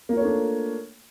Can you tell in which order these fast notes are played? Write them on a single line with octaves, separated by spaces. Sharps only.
A#3 F4 C#5 A3 D4